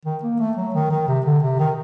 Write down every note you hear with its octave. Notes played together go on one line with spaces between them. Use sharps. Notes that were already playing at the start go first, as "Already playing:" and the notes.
D#3
A#3
A3
F#3
D#3
D#3
C3
D3
C3
D#3